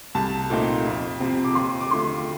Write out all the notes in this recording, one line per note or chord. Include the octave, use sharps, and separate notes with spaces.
C2 A5
A#2 A3 C4 D#4
F2
C3 F3 C4
D6
D#2 C6
D6
D3 F3 A3 C6